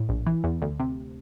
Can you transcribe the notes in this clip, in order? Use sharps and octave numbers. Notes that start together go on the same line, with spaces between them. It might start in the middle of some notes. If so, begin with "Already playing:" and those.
Already playing: A2
A#1
E3
E2
D2
C3